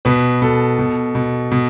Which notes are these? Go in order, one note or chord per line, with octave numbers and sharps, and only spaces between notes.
B2 B4
B2 A4
B2
B2
B2